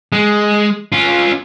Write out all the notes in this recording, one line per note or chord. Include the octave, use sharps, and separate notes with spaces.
G#3
C#4 F4